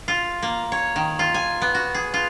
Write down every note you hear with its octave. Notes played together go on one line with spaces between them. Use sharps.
F4
A#3
C#5
D#3
F4
G#5
B3
F#4
G#4
F4